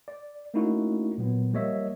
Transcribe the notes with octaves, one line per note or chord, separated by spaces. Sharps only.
D5
A3 A#3 C#4 D#4 E4 F#4
A#2 F#3 B3
F3 G3 A#3 C#5 D#5 E5